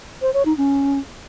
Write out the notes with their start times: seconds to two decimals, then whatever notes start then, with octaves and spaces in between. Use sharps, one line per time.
0.22 C5
0.34 C#5
0.46 D#4
0.57 C#4